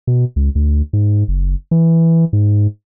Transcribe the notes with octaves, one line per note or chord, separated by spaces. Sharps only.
B2
C#2
D2
G#2
F#1
E3
G#2